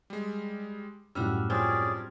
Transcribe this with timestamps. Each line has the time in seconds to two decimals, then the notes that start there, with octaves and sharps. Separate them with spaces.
0.10 G3 G#3
1.15 F#2 A2 G3 D4 F#4 E6 F6
1.50 F3 C4 C#4 G#4 D5 F6 G#6